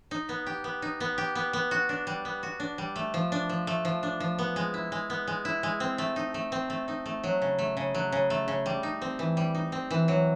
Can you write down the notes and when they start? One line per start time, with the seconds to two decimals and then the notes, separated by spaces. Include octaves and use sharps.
0.11 D#4
0.29 B3
0.46 G4
0.64 B3
0.82 D#4
1.00 B3
1.18 G4
1.35 B3
1.53 B3
1.71 F#4
1.89 D4
2.07 G3
2.25 B3
2.43 F#4
2.60 D4
2.78 G3
2.96 A3
3.14 F3
3.32 D4
3.49 F3
3.67 A3
3.85 F3
4.03 D4
4.20 F3
4.39 B3
4.56 G#3
4.74 E4
4.92 G#3
5.10 B3
5.27 G#3
5.45 E4
5.63 G#3
5.80 C4
5.98 A3
6.16 D#4
6.34 A3
6.52 C4
6.70 A3
6.88 D#4
7.06 A3
7.24 F#3
7.42 C#3
7.59 A3
7.77 C#3
7.95 F#3
8.12 C#3
8.30 A3
8.48 C#3
8.66 G3
8.83 D#4
9.02 C4
9.19 E3
9.37 G3
9.55 D#4
9.72 C4
9.91 E3
10.08 F#3